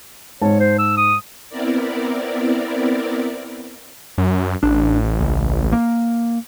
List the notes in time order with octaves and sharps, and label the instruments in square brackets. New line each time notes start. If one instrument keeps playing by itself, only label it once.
[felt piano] G#2 A5 [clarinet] C#5
[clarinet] C5
E6
D#6
[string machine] B3 C4 E4 A#4 D5
[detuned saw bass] F#2
[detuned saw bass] A1 [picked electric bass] D4
[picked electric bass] C#2
A#3